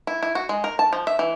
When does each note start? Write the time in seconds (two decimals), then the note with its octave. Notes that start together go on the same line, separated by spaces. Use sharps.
0.07 E4
0.23 E4
0.35 F#4
0.49 G#3
0.64 A#4
0.79 A5
0.93 F3
1.07 E5
1.19 E3